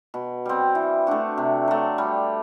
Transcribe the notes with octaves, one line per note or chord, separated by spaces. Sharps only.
B2
G3 C4
E3
A3 D4 F#4
C3
F#3 A3
G3